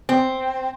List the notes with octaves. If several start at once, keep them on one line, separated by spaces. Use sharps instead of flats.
C4